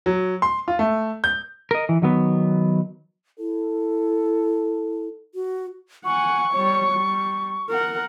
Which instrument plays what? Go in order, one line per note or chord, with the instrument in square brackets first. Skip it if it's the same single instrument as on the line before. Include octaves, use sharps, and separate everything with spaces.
[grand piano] F#3
C6
F4
A3
G6
[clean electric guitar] A#4 D#5
E3
D#3 F#3 B3
[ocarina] E4 [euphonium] A4
[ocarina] F#4
[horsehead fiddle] F#5 G#5 [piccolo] C#6
[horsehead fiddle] G3 C#5
G3
A#4 F#5